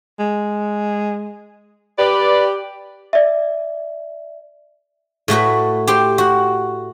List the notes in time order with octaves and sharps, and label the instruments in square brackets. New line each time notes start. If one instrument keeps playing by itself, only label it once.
[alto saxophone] G#3
[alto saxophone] G4 [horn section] B4 D5
[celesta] D5 E5
[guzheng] A2 A3 F#4 B4
G4 C5 G5
F#4